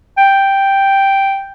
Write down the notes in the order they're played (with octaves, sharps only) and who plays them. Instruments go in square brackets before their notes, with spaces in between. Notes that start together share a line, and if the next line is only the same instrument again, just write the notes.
[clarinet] G5